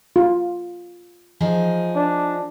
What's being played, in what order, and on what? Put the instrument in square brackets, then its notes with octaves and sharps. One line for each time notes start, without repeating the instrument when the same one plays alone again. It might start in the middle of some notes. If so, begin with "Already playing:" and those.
[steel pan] F4
[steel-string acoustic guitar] F3 D#4 G#4
[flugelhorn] D4